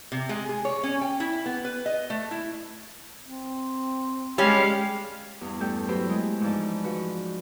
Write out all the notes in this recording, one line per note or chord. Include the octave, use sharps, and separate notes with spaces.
C3
G#3
G#4
C#5
C#4
G5
E4
B3
B4
D#5
A3
E4
C4
G3 G#3 C#4 G4 F5
E2 G2
G2 A3 A4 G5 G6
F#3 E4 G4 B4 C5
G#3 A3
G#2 E3 F3 D5 A5
F3 F#4 B4